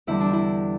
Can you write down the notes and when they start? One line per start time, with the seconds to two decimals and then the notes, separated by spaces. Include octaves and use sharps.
0.07 E2 D3 G3 E4
0.20 D4
0.33 E4